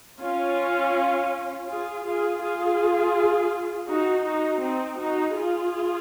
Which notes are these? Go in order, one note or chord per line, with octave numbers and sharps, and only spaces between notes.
C#4 F4
F4 G#4
F4 G#4
F4 G#4
D#4 F#4
D#4 F#4
C4 D#4
D#4 F#4
F4 G#4